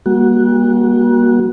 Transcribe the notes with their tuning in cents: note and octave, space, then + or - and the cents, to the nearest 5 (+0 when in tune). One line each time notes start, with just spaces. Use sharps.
G3 +35 A#3 +35 F#4 -5